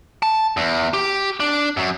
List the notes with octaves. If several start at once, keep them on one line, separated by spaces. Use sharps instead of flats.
A5
E2
G4
D4
F#2